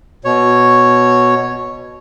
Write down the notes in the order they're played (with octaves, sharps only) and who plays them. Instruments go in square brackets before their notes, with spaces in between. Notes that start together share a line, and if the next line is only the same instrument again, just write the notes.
[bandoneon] B2 C#5